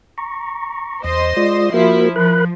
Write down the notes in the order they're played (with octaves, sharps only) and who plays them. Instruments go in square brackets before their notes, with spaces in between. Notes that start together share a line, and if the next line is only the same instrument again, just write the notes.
[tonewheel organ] A#5 C#6
[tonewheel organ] E2 [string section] C5 D#5 C6
[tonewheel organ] G#3 F4 D5
[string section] F3 E4 [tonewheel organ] A#3 F#4 A#4
[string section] F3 [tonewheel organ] A#4 B5 F#6